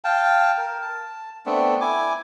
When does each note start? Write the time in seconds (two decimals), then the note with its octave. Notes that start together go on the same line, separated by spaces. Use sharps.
0.04 F5 G5 A5
0.58 A#4
0.82 A5
1.46 A3 B3 C4 D4
1.81 E4 G#5 D6